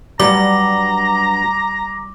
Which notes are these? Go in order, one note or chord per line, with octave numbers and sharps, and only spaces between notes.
G2 F#3 G3 A#5 D6